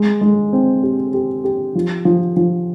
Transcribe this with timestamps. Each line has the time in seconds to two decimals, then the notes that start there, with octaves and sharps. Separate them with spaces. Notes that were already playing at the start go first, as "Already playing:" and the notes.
Already playing: G#3
0.21 G#3
0.53 C4
0.83 G4
1.14 G4
1.44 G4
1.75 F3
2.05 F3
2.37 F3